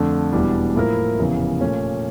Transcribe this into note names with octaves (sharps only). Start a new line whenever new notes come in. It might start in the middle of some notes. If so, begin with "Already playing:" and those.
Already playing: F2 D3 A3 D4
E1 E2 E3 G3 D4
A2 F3 A#3 E4 A#4
F1 E2 C#3 E3
A#2 A3 C#4